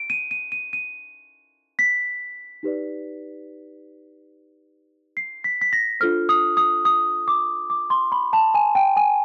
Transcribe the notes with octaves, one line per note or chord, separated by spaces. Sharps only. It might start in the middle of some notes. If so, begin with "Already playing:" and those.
Already playing: D7
D#7
D#7
D#7
D#7
B6
D#4 G4 B4 D5
C7
B6
B6
A#6
D4 F4 A4 C5 F6
D#6
D#6
D#6
D6
D6
C6
B5
A5
G#5
G5
G#5